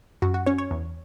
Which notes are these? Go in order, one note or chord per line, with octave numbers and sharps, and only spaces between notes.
F#2 F#4
F#4
C#4 C#5
C#5
E2